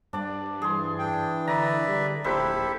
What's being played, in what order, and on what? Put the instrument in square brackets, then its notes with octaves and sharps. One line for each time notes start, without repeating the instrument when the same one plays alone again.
[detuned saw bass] G2 [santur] D4 D5
[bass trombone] E3 [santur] G#4 C6
[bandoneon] D4 G5
[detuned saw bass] D3 [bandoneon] B4 D5 E5 [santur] A#5
[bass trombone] G3
[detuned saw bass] D1 [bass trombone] A#1 [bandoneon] E4 G4 A4 [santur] B4 C5 E5